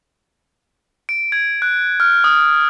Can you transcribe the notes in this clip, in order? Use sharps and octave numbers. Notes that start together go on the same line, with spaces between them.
D7
G#6
F#6
F6
D#6